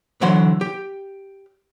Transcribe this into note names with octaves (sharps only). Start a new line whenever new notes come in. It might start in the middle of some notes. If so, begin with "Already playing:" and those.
D3 E3 F#3 C5 F#5 C6
G4